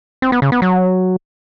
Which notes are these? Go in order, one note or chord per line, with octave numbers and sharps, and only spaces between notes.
C4
B3
C#3
B3
F#3